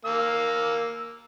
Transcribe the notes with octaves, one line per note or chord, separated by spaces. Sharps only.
A#3 E6